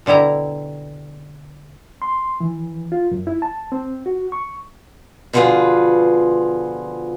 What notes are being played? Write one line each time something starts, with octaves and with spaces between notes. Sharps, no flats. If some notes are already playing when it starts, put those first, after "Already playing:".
B2 D3 G3 E4 A#5
C6
E3
F4
F#2
E4
A5
C4
F#4
C#6
B2 D3 F3 F4 G#4 B4